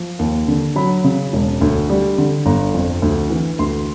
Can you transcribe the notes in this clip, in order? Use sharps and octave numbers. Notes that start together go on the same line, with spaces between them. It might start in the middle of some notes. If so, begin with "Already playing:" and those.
Already playing: F3
D#2
D3
F#3 B5
C#3
E1
D2
G3
D3
G1 A#5
F2
D2
E3
D2 C6